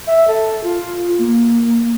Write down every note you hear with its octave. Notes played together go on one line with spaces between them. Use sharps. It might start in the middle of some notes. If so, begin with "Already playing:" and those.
E5
A4
F4
A#3